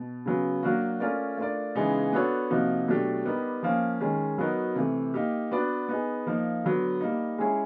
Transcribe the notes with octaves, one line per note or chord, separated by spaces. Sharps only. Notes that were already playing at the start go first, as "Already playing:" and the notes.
Already playing: B2
C#3 F#3 B3
F#3 A#3 D4 F#4
A3 C#4 F4 A#4 D5
A3 D4 F4 A#4 D5
C#3 E3 G#3 B3 D#4
B3 D4 F#4 A4 C#5
C3 F3 A#3 D#4 F#4
B2 F#3 A3 D4 G4
G3 B3 D#4 G4 A#4
F3 A#3 C#4
D#3 G#3 C#4
F#3 B3 D#4 F#4 A#4
C3 E3 A3
A#3 D#4 G4
B3 D4 F#4 B4 D5
B3 D#4 G#4
F3 A#3 D#4
D3 F#3 B3
G3 A#3 D#4
G#3 C#4 E4 G#4 C#5